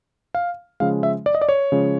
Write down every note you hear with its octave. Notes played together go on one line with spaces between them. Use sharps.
F5
C#3 F3 G#3 F5
E5
D5
D#5
D5
C#5
C#3 F3 G#3